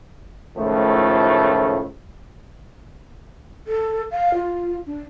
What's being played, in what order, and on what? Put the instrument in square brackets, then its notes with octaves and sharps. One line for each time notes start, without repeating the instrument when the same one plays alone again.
[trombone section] C#2 A2 D#3 F3 A3
[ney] A4
F5
F4
D4